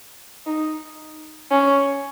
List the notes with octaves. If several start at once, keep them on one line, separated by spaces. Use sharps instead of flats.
D#4
C#4